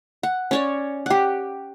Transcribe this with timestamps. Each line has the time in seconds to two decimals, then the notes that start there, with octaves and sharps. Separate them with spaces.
0.23 F#5
0.51 C#4 C#5 D5
1.06 G4 F#5